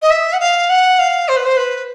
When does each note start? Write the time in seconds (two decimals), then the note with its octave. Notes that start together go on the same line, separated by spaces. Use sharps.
0.01 D#5
0.10 E5
0.32 F#5
0.39 F5
0.69 F#5
0.98 F5
1.28 C5
1.36 B4
1.45 C5
1.56 B4